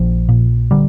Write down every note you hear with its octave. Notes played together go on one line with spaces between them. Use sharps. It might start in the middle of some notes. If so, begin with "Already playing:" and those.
Already playing: A#1 F3
A#2
D3 G3